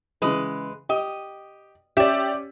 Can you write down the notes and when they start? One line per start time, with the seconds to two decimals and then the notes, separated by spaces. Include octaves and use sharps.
0.22 C#3 E3 G#3 B4
0.89 G4 D#5
1.97 C#4 G4 D5 E5